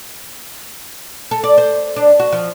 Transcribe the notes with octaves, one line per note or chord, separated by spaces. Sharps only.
A4
D5
C5
D4
F#4
F3